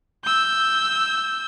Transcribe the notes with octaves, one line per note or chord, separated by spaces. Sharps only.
E6 G6